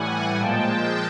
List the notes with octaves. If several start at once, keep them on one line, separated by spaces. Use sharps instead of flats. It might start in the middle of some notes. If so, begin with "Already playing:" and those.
Already playing: A2 E3 G3 F#5 G#5
A#2 F3 G#3 G5 A5